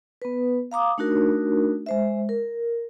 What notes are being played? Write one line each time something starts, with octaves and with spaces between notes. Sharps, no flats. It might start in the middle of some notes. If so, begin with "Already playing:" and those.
B3 B4
F5 A#5 D6 D#6
A3 D4 D#4 F#4 A#4
G#3 C5 E5
A#4